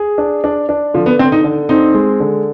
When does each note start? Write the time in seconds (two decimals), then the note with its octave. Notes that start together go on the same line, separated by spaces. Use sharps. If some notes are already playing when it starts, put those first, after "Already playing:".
Already playing: G#4
0.18 D4
0.44 D4
0.69 D4
0.94 D3 F3
1.06 B3
1.19 D3 C4
1.32 D#4
1.44 D3
1.69 C4 D#4
1.94 G#3
2.20 D3